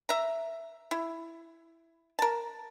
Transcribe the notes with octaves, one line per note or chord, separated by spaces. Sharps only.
E5 A#5
E4
A#4 A5